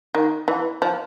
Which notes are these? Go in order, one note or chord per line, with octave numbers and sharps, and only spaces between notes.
D#3
E3
F3